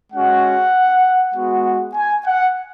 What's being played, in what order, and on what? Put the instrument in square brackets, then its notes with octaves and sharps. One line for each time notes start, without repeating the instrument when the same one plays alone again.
[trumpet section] G#3 C#4 F#4 F#5
G#3 B3 F#4
G#5
F#5